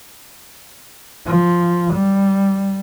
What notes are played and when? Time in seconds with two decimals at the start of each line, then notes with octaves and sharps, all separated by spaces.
1.27 F3
1.94 G3